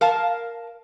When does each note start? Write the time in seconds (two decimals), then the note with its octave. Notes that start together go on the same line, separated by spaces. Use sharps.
0.01 A#4 F5 A5